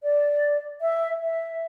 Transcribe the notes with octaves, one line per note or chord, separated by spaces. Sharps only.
D5
E5
E5